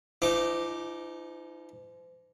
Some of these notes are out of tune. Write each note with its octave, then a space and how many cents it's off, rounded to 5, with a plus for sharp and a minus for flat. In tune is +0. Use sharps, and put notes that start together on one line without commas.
F3 -40 D#4 +0 D6 +0